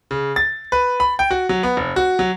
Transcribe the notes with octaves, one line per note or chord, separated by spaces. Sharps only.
C#3
A6
B4
B5
G5
F#4
F#3
B3
F1
F#4
F#3